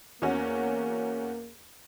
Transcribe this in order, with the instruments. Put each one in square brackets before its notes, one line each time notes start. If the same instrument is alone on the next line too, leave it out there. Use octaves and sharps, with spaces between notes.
[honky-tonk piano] E2 C#4 F#4 [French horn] A#3